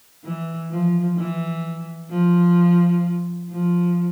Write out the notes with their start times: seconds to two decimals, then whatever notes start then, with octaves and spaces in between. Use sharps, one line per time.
0.24 E3
0.70 F3
1.17 E3
2.10 F3
3.50 F3